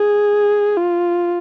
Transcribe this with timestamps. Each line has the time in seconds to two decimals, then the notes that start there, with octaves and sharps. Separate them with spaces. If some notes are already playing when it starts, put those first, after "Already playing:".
Already playing: G#4
0.78 F4